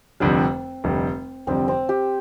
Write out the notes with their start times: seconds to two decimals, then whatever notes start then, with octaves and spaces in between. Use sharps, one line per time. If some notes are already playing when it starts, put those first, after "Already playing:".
0.20 F1 F2 D3 G3 C4
0.84 F1 F2 D3 G3
1.47 F1 F2 D3 G3 C4
1.68 C4
1.89 G4